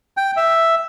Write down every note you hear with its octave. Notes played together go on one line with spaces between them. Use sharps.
G5
E5